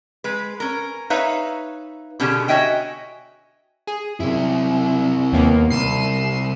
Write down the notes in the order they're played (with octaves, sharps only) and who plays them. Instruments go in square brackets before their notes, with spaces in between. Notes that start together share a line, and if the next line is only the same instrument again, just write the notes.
[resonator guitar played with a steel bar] G#3 B4
C#4 A#4
D#4 B4 C#5 E5 F5
B2 D3 C#4 G4 G#4
F#4 C#5 D#5 E5 G5 G#5
[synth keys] G#4
[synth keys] F#2 [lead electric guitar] C3 E4
[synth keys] D#2 A#3 B3
[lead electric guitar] C2 [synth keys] C7 D#7 E7